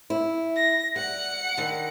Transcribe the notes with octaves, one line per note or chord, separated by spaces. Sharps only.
E4
A#6
G3 F#5 C#7
D3 D#3 G3